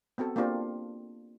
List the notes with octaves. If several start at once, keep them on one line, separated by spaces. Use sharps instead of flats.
B3 C4 F#4 A4
A#3 C4 D4 F4 G4 C5